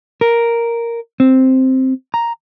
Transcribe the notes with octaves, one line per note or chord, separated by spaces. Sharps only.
A#4
C4
A#5